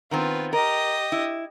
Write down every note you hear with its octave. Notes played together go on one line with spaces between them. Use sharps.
D#3 B3 C4 F4 B4
G4 A#4 D#5
E4